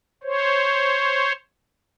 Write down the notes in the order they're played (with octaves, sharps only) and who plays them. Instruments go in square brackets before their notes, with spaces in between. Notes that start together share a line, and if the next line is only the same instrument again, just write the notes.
[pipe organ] C5 C#5